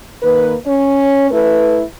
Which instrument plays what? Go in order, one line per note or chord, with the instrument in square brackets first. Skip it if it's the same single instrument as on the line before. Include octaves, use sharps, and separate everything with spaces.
[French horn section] D#3 A#3 B4
C#4 C#5
A3 E4 B4